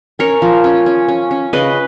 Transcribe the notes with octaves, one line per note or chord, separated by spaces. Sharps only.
C#4 A#4 C#5
F3
C#4
C#4
C#4
C#4
C#3 B4 D#5